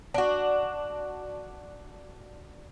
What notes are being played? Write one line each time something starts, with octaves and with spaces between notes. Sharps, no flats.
D4 F#4